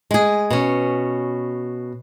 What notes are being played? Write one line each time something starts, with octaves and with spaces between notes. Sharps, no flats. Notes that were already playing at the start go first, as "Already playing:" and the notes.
G#3 G#4
B2 C#4